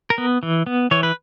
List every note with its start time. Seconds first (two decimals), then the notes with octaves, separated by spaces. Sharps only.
0.10 A#4
0.18 B3
0.43 E3
0.67 B3
0.91 E3 C#5
1.03 B4